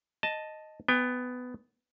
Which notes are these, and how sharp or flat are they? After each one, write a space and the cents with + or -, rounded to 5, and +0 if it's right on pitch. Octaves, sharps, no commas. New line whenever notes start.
D#5 +0 A5 +0
B3 +15 G5 +45